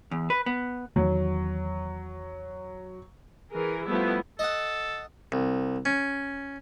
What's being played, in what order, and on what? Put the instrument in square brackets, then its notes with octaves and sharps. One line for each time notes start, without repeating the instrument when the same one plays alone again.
[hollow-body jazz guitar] E2
B4
B3
[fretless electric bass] E2 D#3 [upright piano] F#3
[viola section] E3 G#4 A#4
F3 G3 A3 B3 E4
[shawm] A4 [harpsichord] D#5 F#5
[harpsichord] C2
C#4